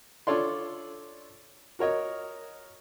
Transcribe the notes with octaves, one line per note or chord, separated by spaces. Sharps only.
D4 F4 A4 C#5 D5 C6
F#4 A#4 C#5 D#5